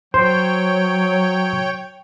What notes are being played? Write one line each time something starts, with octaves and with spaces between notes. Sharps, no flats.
F#3 C5 C#5 G5